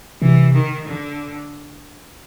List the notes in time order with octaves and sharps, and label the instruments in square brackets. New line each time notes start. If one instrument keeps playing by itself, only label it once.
[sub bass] C3 [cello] E3
[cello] D#3
D3